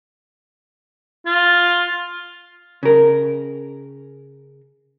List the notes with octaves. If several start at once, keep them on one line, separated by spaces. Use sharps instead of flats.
F4
C#3 A#4